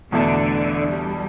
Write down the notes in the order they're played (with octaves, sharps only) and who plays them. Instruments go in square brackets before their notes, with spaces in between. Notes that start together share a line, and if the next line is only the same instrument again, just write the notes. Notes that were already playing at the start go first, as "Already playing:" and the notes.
[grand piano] E2 B2 A3 E4 [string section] D3
[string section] G3